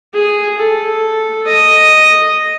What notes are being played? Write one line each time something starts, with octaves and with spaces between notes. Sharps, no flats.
G#4
A4
D#5